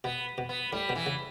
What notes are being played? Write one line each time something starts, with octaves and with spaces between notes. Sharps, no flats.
B2 B3
B2
B3
A2 G3
B2
E3
C#3